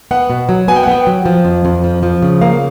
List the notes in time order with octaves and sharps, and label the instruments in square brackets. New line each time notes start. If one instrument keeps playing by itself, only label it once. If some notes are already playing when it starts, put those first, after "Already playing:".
[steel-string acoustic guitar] B3 [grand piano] F#5
[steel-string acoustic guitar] B2
F#3
[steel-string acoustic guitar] B3 [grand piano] G#5
[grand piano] G5
F#5
[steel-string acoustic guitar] B3 [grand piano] G5
[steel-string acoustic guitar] F#3
F3
F2
F2
F3
F3
C#3
[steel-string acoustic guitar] A#3 [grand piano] F5